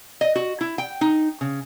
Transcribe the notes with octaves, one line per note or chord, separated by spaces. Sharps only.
D#5
F#4
E4
G5
D#4
C#3